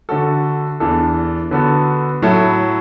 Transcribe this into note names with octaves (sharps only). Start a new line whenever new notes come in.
D3 A3 F#4 A4
E2 E3 D4 A4
D3 B3 F#4 A4
A2 F#3 A3 E4 A4